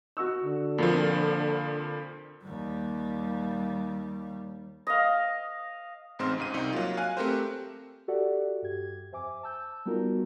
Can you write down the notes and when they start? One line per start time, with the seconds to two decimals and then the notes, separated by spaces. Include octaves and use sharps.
0.17 F#4 C#6 E6
0.42 D3
0.78 F2 A#2 F3 A#3
2.43 D#2 G3
4.87 D#5 F5
6.19 A1 G#2 C4 C5 C6 F6
6.38 C#2 G#2 D#7
6.54 C2 D#4
6.73 F#3 A#3 F4
6.97 F5 G#5 F#6 D#7
7.17 A3 C4 G4 A#4 C5
8.08 F#4 G4 A4 D5 E5 F#5
8.62 G2 G4 G#6
9.12 F2 C5 E5 G#5 D6
9.43 A5 E6 G6
9.86 G3 B3 D#4 F4 F#4 A#4